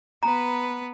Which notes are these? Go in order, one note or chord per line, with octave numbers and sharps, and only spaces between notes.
B3 B4 A#5